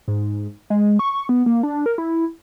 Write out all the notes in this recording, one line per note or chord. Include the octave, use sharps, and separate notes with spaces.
G#2
G#3
C#6
B3
A#3
D4
A#4
E4